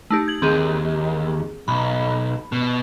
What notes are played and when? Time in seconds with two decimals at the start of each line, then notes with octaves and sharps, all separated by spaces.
0.10 A3 D#4 G4
0.28 G#6 F#7
0.42 D#2 C4 G#4
1.68 B1 B5
2.52 B2